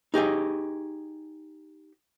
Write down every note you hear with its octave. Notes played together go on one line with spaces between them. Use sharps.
D#4 G4 G#4 D#5